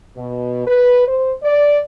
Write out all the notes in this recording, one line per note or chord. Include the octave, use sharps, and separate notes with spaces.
B2
B4
C5
D5